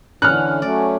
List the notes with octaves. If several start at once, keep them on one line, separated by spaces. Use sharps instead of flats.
D3 E3 C#4 F6 F#6
F#3 A3 C#4 D5